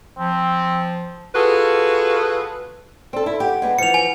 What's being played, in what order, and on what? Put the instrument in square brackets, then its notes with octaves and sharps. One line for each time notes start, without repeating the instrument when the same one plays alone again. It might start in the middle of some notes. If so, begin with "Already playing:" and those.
[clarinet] F3 [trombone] C4
[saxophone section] F4 F#4 G#4 A4 B4
[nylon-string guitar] C4 A4 [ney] D5
[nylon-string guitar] E4 [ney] D5
[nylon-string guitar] G4 [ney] F#5
[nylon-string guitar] G#3 B3 D4
[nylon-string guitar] E3 F3 [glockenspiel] C#7 F7
[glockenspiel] G#5